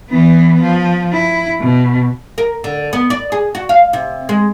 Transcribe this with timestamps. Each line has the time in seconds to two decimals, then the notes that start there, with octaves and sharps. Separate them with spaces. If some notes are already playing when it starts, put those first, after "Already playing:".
0.10 E3 B3
0.61 F3
1.12 E4
1.60 B2
2.38 A#4
2.64 D3
2.93 B3
3.10 D5
3.32 G#4
3.55 F#4
3.69 F5
3.93 C3
4.29 G#3